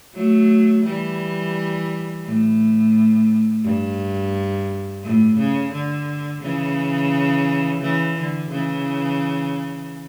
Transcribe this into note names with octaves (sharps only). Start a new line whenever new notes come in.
F#3 A3
E3 G3
A2
G2
A2
C#3
D3
C#3 E3
C#3 E3
D3
C#3 E3